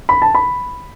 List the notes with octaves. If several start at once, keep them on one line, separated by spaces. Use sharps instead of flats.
B5
A5
B5